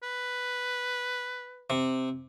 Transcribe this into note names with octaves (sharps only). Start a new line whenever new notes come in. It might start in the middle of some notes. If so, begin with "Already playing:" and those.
B4
C3